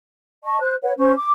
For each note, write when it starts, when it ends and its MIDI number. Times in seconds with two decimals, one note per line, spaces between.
0.45 0.58 75
0.45 0.58 81
0.45 0.58 85
0.60 0.75 72
0.60 0.75 90
0.83 0.93 71
0.83 0.93 73
0.83 0.93 78
0.98 1.12 61
0.98 1.12 72
0.98 1.12 85
1.15 1.32 86